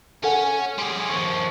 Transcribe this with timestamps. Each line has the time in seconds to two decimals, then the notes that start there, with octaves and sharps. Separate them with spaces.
0.24 C#4 A4 F#5 G#5
0.78 G3 G#4 C6
1.09 D#2 F3 C#6